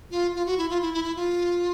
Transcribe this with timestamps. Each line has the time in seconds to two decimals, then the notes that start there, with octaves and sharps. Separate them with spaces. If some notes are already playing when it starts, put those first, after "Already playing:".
0.11 F4
0.35 F4
0.46 F#4
0.58 E4
0.70 F4
0.81 E4
0.94 E4
1.04 E4
1.16 F4